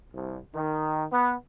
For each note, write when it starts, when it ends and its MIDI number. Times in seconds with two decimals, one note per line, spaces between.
0.13 0.37 36
0.54 1.04 51
1.13 1.33 59